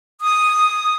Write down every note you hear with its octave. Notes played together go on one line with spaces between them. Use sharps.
D#6